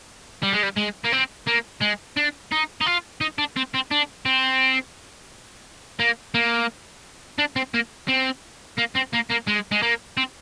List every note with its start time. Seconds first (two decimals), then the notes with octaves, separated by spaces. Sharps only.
0.43 G3
0.53 G#3
0.63 G3
0.77 G#3
1.05 A#3
1.13 C4
1.47 A#3
1.82 G#3
2.17 D4
2.52 D#4
2.81 D#4
2.86 F4
3.21 D#4
3.38 D4
3.56 C4
3.74 C4
3.91 D4
4.26 C4
6.00 A#3
6.34 A#3
7.39 D4
7.56 C4
7.74 A#3
8.08 C4
8.78 A#3
8.95 C4
9.13 A#3
9.30 A#3
9.47 G#3
9.72 G#3
9.82 A#3
10.17 C4